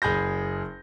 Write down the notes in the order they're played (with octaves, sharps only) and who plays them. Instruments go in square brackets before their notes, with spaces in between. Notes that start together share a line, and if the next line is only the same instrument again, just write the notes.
[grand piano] F#1 G#4 B5 G6 A#6